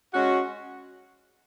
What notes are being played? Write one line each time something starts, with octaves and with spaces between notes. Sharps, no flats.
G#3 C#4 F#4